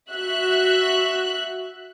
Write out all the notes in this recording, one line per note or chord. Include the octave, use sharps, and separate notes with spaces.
F#4 E5 F#6